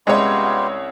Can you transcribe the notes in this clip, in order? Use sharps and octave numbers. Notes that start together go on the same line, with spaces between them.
C2 G#3 B3 C#4 F4 G4 C#5